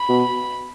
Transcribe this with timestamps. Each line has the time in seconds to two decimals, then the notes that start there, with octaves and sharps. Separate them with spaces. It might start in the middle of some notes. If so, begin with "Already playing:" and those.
Already playing: B5
0.09 B2